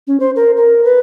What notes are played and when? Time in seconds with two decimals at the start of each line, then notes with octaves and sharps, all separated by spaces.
0.07 C#4
0.20 C5
0.36 A#4
0.57 A#4
0.84 B4